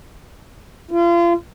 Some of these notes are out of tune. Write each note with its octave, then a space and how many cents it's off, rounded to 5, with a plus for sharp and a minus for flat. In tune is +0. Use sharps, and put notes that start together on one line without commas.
F4 -35